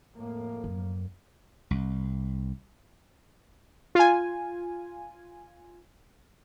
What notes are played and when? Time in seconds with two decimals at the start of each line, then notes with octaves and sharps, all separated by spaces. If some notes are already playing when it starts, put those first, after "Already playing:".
0.15 F2 A2 A#3
0.64 F#2
1.71 C2
3.95 F4 G#5